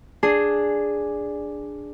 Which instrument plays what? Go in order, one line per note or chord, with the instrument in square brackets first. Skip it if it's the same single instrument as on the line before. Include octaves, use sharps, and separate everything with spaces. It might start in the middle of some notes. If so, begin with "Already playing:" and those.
[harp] D4 G#4